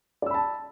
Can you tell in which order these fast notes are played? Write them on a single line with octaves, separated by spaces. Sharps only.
D5 E6 B5 A5